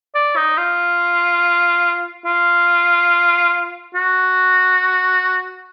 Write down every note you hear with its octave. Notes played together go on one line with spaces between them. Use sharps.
D5
D#4
F4
F4
F#4